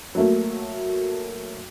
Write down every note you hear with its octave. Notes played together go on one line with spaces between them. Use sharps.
F#3 A3 A#3